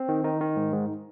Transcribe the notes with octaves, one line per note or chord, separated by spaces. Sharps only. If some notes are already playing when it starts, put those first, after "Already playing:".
Already playing: C4
D#3
D#3 D#4
D#3
G#2
G#2